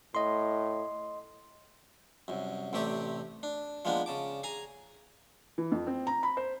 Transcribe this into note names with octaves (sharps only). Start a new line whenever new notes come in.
A2 D#5 C6
C2 F#2
A1 C3 A3 G4 D5
D4
F3 G#3 A#3 B3 D4
C#3 A5 D6
G#4 G#5 A#5
E3
F2
C4
A#5
B5
C5